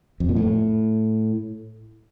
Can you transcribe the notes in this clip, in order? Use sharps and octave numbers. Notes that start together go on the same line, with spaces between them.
F2
A#2
A2